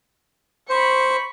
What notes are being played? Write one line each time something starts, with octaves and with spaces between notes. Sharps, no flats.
C5 B5 C#6